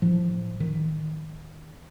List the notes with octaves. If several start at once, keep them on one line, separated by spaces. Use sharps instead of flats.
A2 F3
D#3